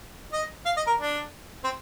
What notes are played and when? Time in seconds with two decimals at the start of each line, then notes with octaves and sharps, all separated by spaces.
0.33 D#5
0.66 F5
0.77 D#5
0.87 A#4
0.99 D4
1.64 C4